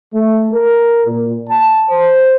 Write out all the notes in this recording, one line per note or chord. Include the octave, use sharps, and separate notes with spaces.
A3
A#4
A#2
A5
C5